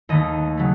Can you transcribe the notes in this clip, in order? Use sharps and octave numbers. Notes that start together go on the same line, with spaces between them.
D#2 D#3 A3 D#5
C#3 F#3 A3